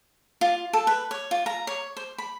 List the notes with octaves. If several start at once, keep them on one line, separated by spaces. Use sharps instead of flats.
F4
A4
B4
C#5
F4
A#5
C#5
C5
B5